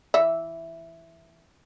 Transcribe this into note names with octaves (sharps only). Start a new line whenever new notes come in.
E3 E5